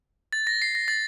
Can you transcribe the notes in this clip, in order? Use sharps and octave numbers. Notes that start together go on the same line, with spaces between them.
A6
A#6
C7
A#6
A6